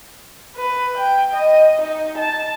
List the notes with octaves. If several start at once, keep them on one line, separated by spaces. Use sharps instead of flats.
B4
G5
D#5
D#4
A5